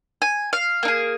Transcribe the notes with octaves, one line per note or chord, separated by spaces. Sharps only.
G#5
F5
A#3 D#4
G#4